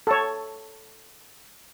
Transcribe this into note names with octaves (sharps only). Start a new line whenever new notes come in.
A4 C#5